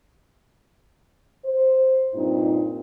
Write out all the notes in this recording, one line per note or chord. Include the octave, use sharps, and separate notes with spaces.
C5
G2 A#2 C4 D#4